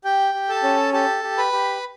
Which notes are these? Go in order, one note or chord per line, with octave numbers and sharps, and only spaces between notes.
G4 G5
G4
A4 A5
C#4
G4 A4 A5
G4
B4 B5
G4